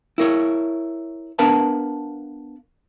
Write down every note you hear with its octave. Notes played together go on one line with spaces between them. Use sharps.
E4 A#4 C#5
B3 D4 A#4 B4 F5 A5